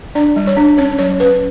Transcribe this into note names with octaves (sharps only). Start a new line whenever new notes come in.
D4 D5
G3
C#5
D4
C#4 C#5
F#3 C#5
C#4 B4